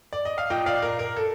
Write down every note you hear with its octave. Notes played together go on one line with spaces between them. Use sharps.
D5
D#5
F5
A#2 D#5 G5
D5 F5
A#4
A#4
A4